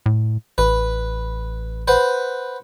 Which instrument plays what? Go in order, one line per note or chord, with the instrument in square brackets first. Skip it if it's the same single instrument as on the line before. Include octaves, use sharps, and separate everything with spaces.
[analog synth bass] A2
[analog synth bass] A1 [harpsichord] B4
[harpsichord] B4 C5 F#5